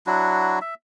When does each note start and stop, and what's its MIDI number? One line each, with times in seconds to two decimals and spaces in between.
0.06 0.59 54
0.06 0.59 62
0.06 0.59 64
0.06 0.59 66
0.61 0.74 76